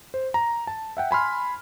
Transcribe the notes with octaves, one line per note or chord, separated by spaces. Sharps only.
C5
A#5
A5
E5 F#5 G5
G#5 B5 C6 F6